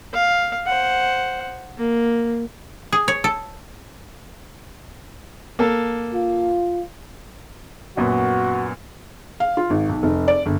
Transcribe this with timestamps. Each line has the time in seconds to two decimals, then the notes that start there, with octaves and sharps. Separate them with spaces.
0.14 F5
0.66 C5 F#5
1.78 A#3
2.92 G#4
3.08 C#5
3.24 A4
5.59 A#3 A4
6.13 F4
7.97 F#2 A#2 B3 F#4
9.40 F5
9.57 F4
9.70 G#1
9.89 B1
10.03 F1
10.28 D5
10.46 G1